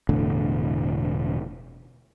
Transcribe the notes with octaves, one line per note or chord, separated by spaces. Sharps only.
E1 A2 D3